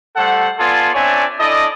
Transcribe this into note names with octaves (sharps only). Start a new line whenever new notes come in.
G3 A3 A4 C5 F#5
B3 F4 A4 D5 G#5 C6
C4 D4 C#5 D5 E5 G#5
D4 E4 A4 D5 D#5